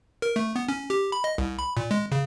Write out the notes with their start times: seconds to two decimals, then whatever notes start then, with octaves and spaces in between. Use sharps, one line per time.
0.22 A#4
0.36 A3
0.56 B3
0.69 C#4
0.90 G4
1.12 B5
1.24 D#5
1.38 C2
1.59 B5
1.77 A#2
1.91 G#3
2.12 C#3